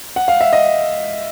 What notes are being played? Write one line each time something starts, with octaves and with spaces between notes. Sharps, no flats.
F#5
F5
E5
D#5